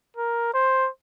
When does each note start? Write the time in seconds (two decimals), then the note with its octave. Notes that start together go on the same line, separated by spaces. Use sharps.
0.17 A#4
0.54 C5